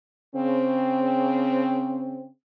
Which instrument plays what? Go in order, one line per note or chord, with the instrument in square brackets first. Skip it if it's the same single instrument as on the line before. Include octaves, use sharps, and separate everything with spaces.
[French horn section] C#3 C4